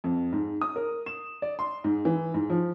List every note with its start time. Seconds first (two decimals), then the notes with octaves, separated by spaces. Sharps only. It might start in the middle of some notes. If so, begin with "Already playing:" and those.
0.04 F2
0.33 G#2
0.61 D#6
0.76 A#4
1.06 E7
1.42 D5
1.59 C6
1.84 G#2
2.05 E3
2.34 G#2
2.50 F3